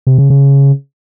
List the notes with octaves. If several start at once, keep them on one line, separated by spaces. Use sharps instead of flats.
C3
C#3
C#3